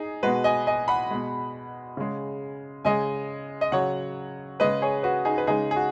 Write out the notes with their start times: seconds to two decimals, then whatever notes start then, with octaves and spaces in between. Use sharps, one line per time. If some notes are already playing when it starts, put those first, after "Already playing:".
Already playing: D#4 G#4
0.23 B2 G#3 F#4 B4
0.44 D#5 G#5
0.67 D#5 G#5
0.88 F#5 B5
1.10 B2 G#3
1.97 C#3 G#3
2.85 C#3 G#3 D#5 G#5
3.61 D#5
3.72 C#3 F#3 C#5 F#5
4.60 C#3 G#3 B4 D#5
4.82 G#4 C#5
5.03 F#4 B4
5.25 D#4 G#4
5.38 B4
5.47 C#3 G#3 D#4 G#4
5.71 G#4
5.76 F#4